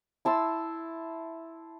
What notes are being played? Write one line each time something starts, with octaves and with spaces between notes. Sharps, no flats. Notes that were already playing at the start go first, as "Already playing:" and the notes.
E4 A5 C6 E6